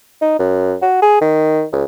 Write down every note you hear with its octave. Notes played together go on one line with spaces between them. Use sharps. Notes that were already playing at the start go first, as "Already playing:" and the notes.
D#4
F#2
F#4
G#4
D#3
C#2